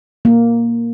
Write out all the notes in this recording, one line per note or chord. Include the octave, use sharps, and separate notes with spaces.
A#3